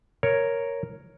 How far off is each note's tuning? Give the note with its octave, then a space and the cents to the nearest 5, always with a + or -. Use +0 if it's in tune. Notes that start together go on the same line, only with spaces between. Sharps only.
A#4 +0 C#5 +0